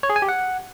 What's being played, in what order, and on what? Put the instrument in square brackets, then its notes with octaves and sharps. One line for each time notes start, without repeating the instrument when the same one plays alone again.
[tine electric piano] C#5
G#4
G#5
G4
F#5